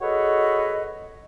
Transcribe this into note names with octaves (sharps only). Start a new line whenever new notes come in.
F#4 G#4 A4 B4 C#5 D#5